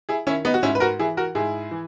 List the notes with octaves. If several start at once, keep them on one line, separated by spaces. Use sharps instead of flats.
E4 G#4
D#3 C#4 E4
B3 D#4
F#4
G#2 C#4 E4
B4
F#4 A#4
E3 E4 G#4
F#4 A#4
G#2 E4 G#4
E3